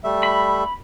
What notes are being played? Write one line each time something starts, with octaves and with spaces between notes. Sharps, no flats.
G3 A3 E5
B5